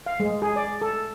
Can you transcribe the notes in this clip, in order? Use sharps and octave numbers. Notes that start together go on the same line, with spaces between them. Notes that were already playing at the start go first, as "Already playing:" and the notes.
F5
G#3
G#4
D5
A4